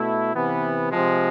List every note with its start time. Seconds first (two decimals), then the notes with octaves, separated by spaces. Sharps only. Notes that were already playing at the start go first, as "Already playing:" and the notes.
Already playing: B2 A3 E4
0.34 C3 E3 B3
0.91 C3 F3 G#3